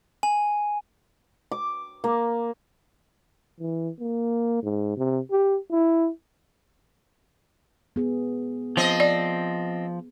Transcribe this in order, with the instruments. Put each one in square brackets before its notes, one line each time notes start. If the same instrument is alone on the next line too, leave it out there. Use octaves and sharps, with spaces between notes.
[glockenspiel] G#5
[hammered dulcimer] D6
A#3
[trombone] E3
A#3
G#2
C3
G4
E4
[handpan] B3 G#4
[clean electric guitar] F3 [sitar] C4 D#5
[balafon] D5